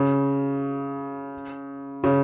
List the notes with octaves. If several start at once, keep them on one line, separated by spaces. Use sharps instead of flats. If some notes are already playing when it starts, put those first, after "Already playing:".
Already playing: C#3
C#3